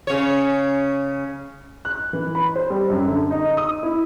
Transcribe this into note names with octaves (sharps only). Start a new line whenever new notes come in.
C#3 C#5
F#6
E3
B5
C5
G3
F#2
D3
D#4
D#6
E4